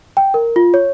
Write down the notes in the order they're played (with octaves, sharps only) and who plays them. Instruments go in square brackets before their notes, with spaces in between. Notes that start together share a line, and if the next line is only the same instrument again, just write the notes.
[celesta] G5
A#4
F4
C#5